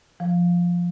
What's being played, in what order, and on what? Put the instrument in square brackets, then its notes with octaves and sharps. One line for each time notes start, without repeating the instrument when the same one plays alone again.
[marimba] F3